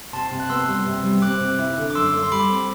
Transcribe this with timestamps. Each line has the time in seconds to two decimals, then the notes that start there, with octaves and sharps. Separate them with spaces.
0.13 C3 A5 C6
0.32 C3
0.40 F#6
0.50 B3 C6 E6
0.68 G3
0.86 C3
1.04 G3
1.22 C4 D6 F#6
1.40 C3
1.59 E4
1.77 D3
1.90 D6
1.95 F#2 C6 E6
2.13 A3
2.23 C6
2.32 G3 B5 D6
2.50 C4